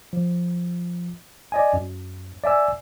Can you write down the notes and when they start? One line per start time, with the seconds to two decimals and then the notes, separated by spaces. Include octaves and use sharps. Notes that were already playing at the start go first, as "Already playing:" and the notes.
0.13 F3
1.52 D5 D#5 G#5
1.73 F#2
2.44 D5 E5 G#5 E6